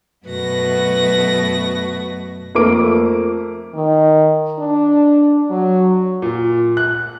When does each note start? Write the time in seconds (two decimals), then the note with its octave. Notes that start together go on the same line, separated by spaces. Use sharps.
0.27 F#2 B2 A3 F#4 B4 A#6
2.55 F2 A3 A#3 D6 D7
3.75 D#3
4.59 D4
5.50 F#3
6.22 A#2
6.77 F#6